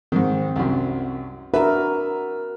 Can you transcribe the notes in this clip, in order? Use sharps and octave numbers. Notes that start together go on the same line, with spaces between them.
G#2 D#3 C4
C2 F#2
D4 F#4 A#4 B4 E5